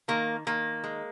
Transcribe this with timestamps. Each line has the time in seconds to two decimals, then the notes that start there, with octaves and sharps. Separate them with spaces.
0.08 D#3 A#3
0.47 D#3 A#3
0.84 G#3